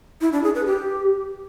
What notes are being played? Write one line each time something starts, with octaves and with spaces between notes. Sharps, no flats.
E4
D4
G#4
B4
G4